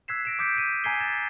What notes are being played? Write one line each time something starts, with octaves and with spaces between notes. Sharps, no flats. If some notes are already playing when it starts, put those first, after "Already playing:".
E6 F#6 G#6 B6 C7 E7
A#6 D7 E7
D6 D#6 G6 B6 C#7 D7
D7 D#7
G#5 A#5 G#6 B6 C7 G7
G#6 A6 C7 E7